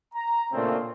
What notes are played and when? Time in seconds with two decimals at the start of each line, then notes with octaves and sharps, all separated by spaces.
0.14 A#5
0.52 A#2 C#3 A3 C4 D4 F4